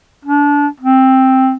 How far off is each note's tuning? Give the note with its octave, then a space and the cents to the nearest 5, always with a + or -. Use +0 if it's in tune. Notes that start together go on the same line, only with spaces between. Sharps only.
D4 -25
C4 +5